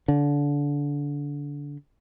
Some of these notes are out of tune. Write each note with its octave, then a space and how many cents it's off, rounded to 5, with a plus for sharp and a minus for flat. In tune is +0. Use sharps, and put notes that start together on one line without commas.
D3 -25